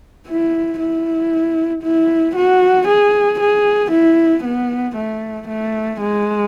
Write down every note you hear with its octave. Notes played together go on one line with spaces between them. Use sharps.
E4
E4
E4
F#4
G#4
G#4
E4
B3
A3
A3
G#3